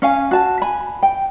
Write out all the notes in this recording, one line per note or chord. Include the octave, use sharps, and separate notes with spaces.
C#4 F5 G#5
F#4 A5
G#5 B5
G5